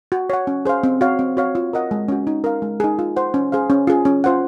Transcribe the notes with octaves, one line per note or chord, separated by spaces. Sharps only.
F#4
C#5 F#5
C#4
G#4 C5 F5
C4
F#4 C#5 F5
C4
F#4 C#5 F5
F4
A#4 D#5 F#5
G#3
C#4 F#4
D#4
A#4 F5
G#3
D#4 G#4
F4
C5 F#5
C#4
G#4 C5 F5
C#4
F4 G#4
C#4
F4 C5 F#5